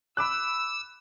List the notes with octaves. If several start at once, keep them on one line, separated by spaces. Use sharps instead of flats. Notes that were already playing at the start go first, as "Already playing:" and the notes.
B5 D6 E6 F#6